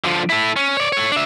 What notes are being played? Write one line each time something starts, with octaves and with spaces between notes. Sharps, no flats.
D3 F3
E4 A4
C#4
C#5 D5
A4 C#5
D4 E5